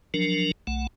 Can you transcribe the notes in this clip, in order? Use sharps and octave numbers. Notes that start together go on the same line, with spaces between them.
F3 F#3 D4 A#4
B1 A3 F#5